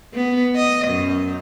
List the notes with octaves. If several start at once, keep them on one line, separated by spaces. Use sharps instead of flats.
B3
D#5
F#2